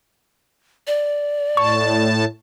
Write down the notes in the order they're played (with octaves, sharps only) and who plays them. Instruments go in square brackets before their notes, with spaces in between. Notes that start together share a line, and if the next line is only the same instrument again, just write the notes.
[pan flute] D5
[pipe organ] A2 A5 [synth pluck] C#6